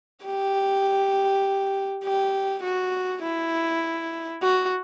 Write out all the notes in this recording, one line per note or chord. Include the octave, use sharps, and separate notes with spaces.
G4
G4
F#4
E4
F#4